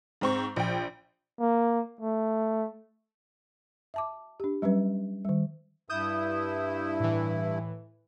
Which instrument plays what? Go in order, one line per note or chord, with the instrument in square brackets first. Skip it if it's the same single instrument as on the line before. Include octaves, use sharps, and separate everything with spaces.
[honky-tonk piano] G#2 C4 C#6
A#1 G5
[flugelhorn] A#3
A3
[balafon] E5 A5 D6
D4 G4
F#3 G3 C#4 B4
D#3 G3
[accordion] G2 E4 [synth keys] D#6 G6 E7
[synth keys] A2 E3